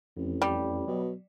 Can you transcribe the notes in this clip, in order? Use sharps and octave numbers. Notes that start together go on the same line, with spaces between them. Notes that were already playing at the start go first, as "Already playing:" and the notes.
A1 F2
G3
B2 F#3